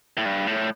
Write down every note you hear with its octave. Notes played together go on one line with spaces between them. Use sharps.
A2
G2
A2